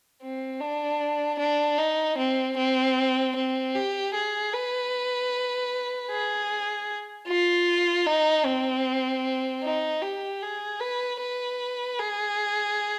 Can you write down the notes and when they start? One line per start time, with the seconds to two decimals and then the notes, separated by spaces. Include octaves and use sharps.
0.22 C4
0.60 D4
1.39 D4
1.78 D#4
2.17 C4
2.57 C4
3.36 C4
3.75 G4
4.14 G#4
4.53 B4
6.10 G#4
7.28 F4
8.06 D#4
8.45 C4
9.63 D#4
10.02 G4
10.42 G#4
10.80 B4
11.20 B4
11.99 G#4